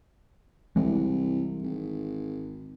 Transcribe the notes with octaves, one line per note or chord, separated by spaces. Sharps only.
C2 E3 G#3
G#1